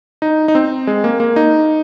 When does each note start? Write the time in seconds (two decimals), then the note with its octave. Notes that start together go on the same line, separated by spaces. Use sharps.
0.22 D#4
0.48 D#4
0.55 C4
0.87 G#3
1.04 A#3
1.20 A#3
1.36 D#4